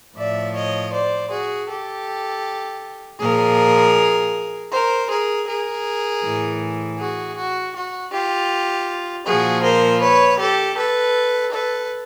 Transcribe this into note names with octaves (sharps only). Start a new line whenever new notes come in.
A2 F3 D5 E5
C#5 D#5
C5 D5
F#4 G#4
G4 A4
A#2 F3 G#4 A#4
A#4 C5
G#4 A#4
G#4 A#4
A2 E3
F#4 G#4
F#4
F#4
F4 G4
A#2 F3 F#4 G#4
A#4 C5
B4 C#5
G4 A4
A4 B4
A4 B4